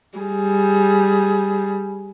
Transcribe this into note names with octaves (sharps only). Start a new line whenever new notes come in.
G3 G#4